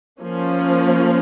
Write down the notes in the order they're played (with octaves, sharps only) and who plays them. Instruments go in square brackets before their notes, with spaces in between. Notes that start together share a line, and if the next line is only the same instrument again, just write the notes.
[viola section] F3 A#3 C#4